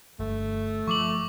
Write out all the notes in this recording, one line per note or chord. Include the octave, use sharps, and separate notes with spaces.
G1 A3
F3 C#6 D6 F#7